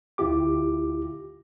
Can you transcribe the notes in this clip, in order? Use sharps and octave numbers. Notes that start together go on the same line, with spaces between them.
D2 E4 F4 G4 D6